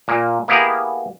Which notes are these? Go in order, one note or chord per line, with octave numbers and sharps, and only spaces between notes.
A#2 A#3
A#3 B3 E4 G4 G#4 A#4